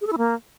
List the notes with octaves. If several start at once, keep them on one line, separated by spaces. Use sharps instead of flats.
G#4
A4
E4
A#3